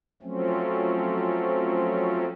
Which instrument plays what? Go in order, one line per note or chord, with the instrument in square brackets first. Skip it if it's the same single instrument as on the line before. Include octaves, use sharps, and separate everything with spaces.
[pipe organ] F3 F#3 A3 C4 C#4